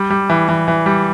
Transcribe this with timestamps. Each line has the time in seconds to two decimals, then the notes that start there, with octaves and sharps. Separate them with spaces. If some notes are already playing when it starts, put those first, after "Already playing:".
Already playing: G3
0.10 G3
0.30 E3
0.48 E3
0.68 E3
0.86 G3